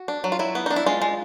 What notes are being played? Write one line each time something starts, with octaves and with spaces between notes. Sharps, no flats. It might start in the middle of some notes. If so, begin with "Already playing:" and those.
Already playing: F#4
D4
F#3
F4
F#3 E4
B3
D4 D#4
E4
G#3 F4
G#3